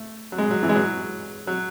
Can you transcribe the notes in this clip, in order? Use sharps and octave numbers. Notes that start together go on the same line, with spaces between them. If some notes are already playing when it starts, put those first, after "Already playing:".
Already playing: A3
F#3
G#3
F#3
E3
G#3
F#3
F#3